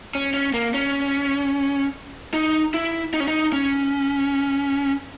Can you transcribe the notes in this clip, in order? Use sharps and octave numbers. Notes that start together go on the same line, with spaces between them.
C#4
C#4
A#3
C#4
D#4
E4
D#4
C#4
D#4
C#4